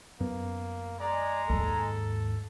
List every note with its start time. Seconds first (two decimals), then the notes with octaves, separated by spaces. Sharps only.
0.20 F#2 A#3 B3
1.00 G#3 D5 A#5
1.49 D#2 G#2 A4